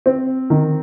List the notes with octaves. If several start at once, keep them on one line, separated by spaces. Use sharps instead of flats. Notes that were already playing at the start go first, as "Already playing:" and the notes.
C4
D#3